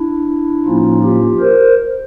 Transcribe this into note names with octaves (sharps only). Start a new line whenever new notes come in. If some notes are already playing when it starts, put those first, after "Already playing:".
Already playing: D4 E4
A2 F3 A#3 C#4 D#4 F4
F4 G4
A#4 C5